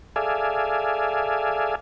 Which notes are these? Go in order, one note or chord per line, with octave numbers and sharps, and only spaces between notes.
G#4 A4 D5 E5 F5 G#5